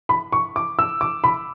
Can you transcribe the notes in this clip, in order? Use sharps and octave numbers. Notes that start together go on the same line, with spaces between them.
B5
C#6
D6
E6
D6
B5